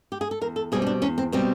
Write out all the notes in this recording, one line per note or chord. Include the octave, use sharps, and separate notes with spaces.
G4
G#4
A4
E2 A#4
A4
B2 G3 C4 G#4
C#4
D4
E2 C#4
C4
B2 G3 C4 C#4